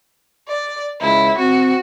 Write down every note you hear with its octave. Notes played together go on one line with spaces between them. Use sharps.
D5
C#2 E4
C4 F#4